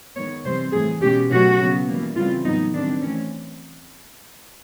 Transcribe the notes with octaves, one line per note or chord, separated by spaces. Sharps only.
D#3 G#3 B3 C#5
C3 E3 G3 C4 C5
A2 E3 A3 G#4
B2 G#3 C#4 G4
B2 F#3 A3 C#4 F#4
C#3 F#3 B3
E3 G3 A#3
C#3 E3 G3 C4 F4
A2 F#3 B3 D#4
D#3 G3 C4 D4
E3 A3 C4 C#4